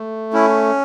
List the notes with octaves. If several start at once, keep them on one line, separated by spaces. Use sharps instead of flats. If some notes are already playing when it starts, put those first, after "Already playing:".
Already playing: A3
C#4 E4